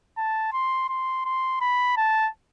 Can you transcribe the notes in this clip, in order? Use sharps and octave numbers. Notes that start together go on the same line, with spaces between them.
A5
C6
C6
C6
B5
A5